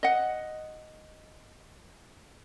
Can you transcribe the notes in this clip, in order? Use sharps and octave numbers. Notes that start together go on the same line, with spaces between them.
D#5 F#5